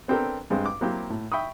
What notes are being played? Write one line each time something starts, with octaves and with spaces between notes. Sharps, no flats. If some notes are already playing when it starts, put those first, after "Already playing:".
B3 C4 D4 G4 A4 A#4
G2 G#3 C4
D6
F#3 A#3 C4 E4 G4
A2
E5 G5 B5 C#6 D#6